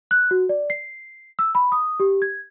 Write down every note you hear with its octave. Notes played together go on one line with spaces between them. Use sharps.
F#6
F#4
D5
C7
E6
B5
D#6
G4
G#6